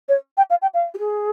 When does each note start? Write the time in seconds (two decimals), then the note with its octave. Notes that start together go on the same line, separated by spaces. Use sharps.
0.09 C#5
0.37 G5
0.50 F5
0.62 G5
0.74 F5
0.94 G4
0.99 G#4